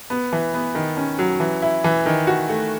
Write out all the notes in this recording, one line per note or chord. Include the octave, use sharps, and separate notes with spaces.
B3
E3
B3
D#3
C#4
F#3
E3
E4
E3
D#3
F#4
A3